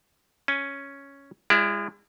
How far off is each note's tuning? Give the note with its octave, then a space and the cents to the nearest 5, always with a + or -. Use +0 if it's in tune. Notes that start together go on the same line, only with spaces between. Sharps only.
C#4 +0 G#5 +0
G#3 -35 E4 +30 D5 +0